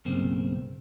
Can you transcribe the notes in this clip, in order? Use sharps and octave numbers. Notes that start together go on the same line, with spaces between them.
B1 G2 C#3 A#3 C4